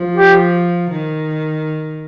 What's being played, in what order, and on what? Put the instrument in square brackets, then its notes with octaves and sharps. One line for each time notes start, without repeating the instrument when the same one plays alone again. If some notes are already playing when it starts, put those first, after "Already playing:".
Already playing: [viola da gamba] F3
[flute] G4
[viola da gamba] D#3